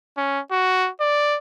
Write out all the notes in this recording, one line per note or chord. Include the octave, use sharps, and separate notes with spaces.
C#4
F#4
D5